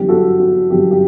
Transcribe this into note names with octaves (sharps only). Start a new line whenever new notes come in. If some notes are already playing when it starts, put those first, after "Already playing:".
Already playing: G1 F#2 E3 G4
F#4 A4
F#4
G1 F#2 E3 G4
G4